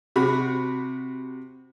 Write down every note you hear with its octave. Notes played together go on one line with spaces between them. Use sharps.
C3 F#4 B5